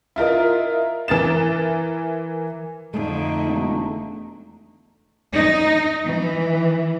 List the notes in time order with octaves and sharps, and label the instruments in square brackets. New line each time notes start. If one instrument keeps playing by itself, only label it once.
[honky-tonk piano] E4 F4 A#4 D#5
E3 A#4 A6 E7
[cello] F2 D3 [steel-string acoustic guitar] A3 [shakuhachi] D#4
[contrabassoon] E1
[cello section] D#4
E3